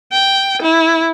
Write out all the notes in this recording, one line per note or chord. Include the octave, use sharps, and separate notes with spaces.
G5
E4